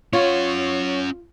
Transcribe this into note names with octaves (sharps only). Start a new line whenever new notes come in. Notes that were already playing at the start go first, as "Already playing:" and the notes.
C#4 F4 C#5 F#5